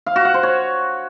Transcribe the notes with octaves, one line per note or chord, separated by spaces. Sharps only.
F5
F#4
F#5
C5
C#5